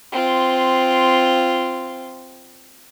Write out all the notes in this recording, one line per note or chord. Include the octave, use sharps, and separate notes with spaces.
C4 F4